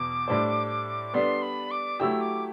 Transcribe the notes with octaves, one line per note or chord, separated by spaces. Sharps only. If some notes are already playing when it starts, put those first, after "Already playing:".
Already playing: E2 B2 D6
A2 G3 D4 A4 C5
G3 B3 D4 A4 C6
B5
D6
F#3 A3 E4 G4 E6
D6